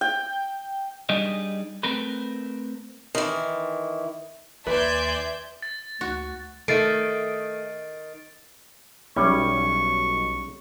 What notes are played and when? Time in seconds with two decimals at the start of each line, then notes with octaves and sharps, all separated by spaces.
0.01 G5
1.09 G3 D4 D#4 G#4 D#5
1.83 A3 C4 A#4 B4
3.15 D#3 E3
4.67 D#2 B4 D5 E5 G#5 C6 G6
5.62 A6
6.01 D2 F#4
6.68 D#3 A3 A4 E5 A6 C7 D7
9.16 B1 G3 C#4 E4 C#6